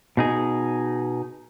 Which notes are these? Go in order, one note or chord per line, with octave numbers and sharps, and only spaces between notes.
B2 D#4 G#4